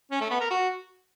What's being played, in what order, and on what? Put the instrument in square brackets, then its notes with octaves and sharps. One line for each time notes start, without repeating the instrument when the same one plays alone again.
[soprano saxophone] C#4
A3
B3
A#4
F#4